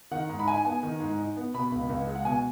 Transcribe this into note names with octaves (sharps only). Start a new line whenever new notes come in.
D#3 F#5
G#2
B5
D#4 G#5
B3 G#5
D#3
G#2
D#4
B3
B2 B5
C#2
C#2
G#3
F#5
B2 G#5